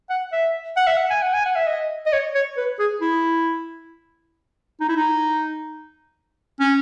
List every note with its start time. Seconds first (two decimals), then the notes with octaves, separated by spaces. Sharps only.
0.10 F#5
0.32 E5
0.77 F#5
0.87 E5
0.97 F#5
1.11 G#5
1.22 F#5
1.34 G#5
1.45 F#5
1.56 E5
1.67 D#5
2.06 D#5
2.12 C#5
2.35 C#5
2.57 B4
2.79 G#4
3.01 E4
4.80 D#4
4.89 E4
4.96 D#4
6.60 C#4